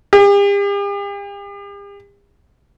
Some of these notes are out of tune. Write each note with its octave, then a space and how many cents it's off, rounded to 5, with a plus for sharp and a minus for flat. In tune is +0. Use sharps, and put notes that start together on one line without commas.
G4 +45